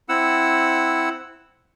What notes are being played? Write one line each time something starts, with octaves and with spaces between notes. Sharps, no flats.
C4 E4 F#5 E6